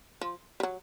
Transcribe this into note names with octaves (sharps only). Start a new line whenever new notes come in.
F3
G3
F#3